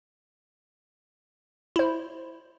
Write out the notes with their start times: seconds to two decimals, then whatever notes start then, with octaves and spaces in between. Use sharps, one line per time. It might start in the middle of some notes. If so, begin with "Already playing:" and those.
1.76 E4 C5